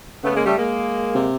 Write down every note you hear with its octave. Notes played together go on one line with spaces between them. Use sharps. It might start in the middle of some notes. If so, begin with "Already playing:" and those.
C#3 A3 B3
G#3 A#3
G3 A3
G#3 A#3
C3